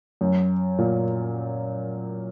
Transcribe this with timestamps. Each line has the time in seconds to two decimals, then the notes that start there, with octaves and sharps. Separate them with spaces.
0.21 F#2
0.78 A#2